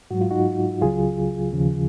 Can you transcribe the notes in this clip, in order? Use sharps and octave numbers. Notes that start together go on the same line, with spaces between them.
G#2 F#3 F#4
F4
D#4 F#4
C#2 C#3 F#3 F4 G#4
D#2 C#3 F3